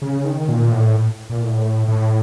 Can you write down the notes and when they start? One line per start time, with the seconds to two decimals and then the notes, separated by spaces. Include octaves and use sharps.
0.02 C#3
0.25 D#3
0.49 A#2
0.72 A2
1.29 A#2
1.41 A2
1.88 A2